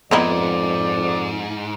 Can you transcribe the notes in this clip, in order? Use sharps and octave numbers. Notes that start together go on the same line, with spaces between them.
F2 G#2 B3 D#4 E4 D5